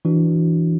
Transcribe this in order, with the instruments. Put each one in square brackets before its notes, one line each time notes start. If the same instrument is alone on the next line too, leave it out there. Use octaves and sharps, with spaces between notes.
[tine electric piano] E3 D4 F#4